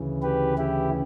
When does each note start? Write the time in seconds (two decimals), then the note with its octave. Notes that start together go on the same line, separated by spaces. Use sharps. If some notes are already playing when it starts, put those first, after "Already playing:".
Already playing: D2 C#3 E3
0.22 G4 B4
0.58 E4 G4